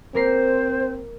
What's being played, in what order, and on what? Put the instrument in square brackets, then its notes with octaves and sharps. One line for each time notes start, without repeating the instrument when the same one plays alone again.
[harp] A#3 A#4 C7 [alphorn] C4 [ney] C5